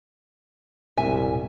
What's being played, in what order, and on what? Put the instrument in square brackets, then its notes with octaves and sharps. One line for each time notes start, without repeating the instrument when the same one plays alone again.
[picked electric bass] D#1 G#2 B2 [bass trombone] C2 [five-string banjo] E5 G#5